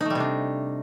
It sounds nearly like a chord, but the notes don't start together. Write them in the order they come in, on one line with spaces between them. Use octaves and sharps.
D#4 A3 G3 C3 D4